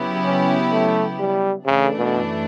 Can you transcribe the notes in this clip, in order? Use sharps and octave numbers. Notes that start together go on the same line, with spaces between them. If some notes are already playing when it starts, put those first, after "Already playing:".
Already playing: C#3 F#3 B3 E4 G4
C#4
A3
G3
F#2 C#3 E3 A3 D4
B2